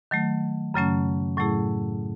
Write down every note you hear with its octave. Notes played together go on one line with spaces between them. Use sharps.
D#3 F#3 A3
F#2 C#3 F#3 A3 C#4
A2 F#3 A3 E4 G#4